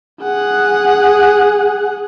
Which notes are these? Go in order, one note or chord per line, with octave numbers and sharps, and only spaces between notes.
G#4 F#5